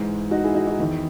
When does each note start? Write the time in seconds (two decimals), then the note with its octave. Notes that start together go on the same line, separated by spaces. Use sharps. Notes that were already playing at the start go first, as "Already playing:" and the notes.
Already playing: G#2 E3 G#3
0.31 D#4 F#4
0.43 E4 G#4
0.55 D#4 F#4
0.67 D#4 F#4
0.79 E2 D#3